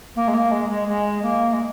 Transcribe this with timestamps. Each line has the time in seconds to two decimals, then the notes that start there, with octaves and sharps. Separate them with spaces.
0.16 A#3
0.28 G#3
0.34 A#3
0.52 G#3
0.69 G#3
0.88 G#3
1.23 A#3
1.53 G#3